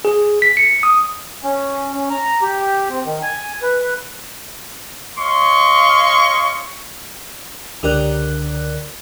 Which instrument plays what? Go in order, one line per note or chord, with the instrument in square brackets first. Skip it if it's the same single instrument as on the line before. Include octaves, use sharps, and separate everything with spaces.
[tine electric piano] G#4
B6
C#7
D#6
[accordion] C#4
C#4
A#5
G4
C4
D#3
G#5
B4
[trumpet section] C#5 D#5 F5 C6 C#6
[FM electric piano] C#2 D3 G4 A#4 D5 F#6